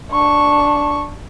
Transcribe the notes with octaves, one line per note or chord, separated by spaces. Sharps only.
D4 C#6